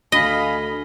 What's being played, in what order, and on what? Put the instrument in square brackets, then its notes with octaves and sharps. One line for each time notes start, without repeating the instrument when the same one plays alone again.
[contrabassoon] D2 [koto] D#5 [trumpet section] F5 G#5 B5